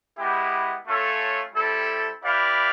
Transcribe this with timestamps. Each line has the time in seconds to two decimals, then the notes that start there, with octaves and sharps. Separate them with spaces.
0.19 G#3 B3 E4 G4
0.87 A3 C#4 F4 A4 C#5
1.55 G3 C4 E4 A4
2.23 E4 G4 B4 D5 F5